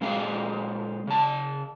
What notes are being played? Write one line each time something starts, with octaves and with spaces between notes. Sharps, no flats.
A#2 G#3 C4 F5
C#3 A5